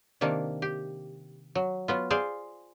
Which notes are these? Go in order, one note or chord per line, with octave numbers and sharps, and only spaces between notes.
C3 D#3 A#3 D4
G4
F#3
F#3 B3 F4
G#4 C5 D5 F5